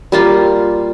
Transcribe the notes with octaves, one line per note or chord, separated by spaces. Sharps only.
G3 A#3 F4